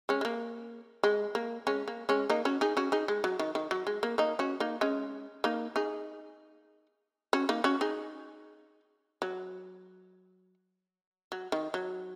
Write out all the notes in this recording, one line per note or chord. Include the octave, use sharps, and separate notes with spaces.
G#3 C#4
G#3
A#3
G#3
A#3
G#3 C#4
A#3
G#3 C#4
A#3 D#4
C#4 F#4
D#4 G#4
C#4 F#4
D#4 G#4
G#3
F#3
D#3
D#3
F#3
G#3
A#3
A#3 D#4
C#4 F#4
A#3 D#4
G#3 C#4
A#3 D#4
D#4 G#4
C#4 F#4
A#3 D#4
C#4 F#4
D#4 G#4
F#3
F#3
D#3
F#3